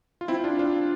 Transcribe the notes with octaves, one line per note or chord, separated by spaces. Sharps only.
F4
C4 E4
D4 F4
D4 F4